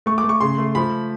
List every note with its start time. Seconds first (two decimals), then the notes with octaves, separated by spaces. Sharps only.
0.06 A3 C#6
0.18 D6
0.24 A3
0.29 C#6
0.41 C#3 C6
0.58 A3
0.75 F3 B5